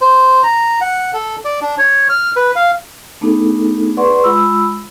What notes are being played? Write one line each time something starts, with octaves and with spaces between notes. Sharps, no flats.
C5
A#5
F#5
A4
D5
D4
C#5
F6
B4
F5
A3 B3 D4 D#4 G#4 A4
G#4 B4 D5 F#5 C6 C#6
G#3 F4 B5 E6